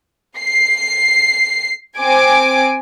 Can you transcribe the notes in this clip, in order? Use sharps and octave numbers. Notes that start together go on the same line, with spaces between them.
C7
C4 G#5 D6 D7